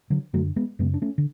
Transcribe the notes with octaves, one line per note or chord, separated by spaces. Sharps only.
D3 F#3
F#2 D3 F#3 A3
G#3 B3
F#2 C#3 G#3 B3
D4
A3 C#4
D3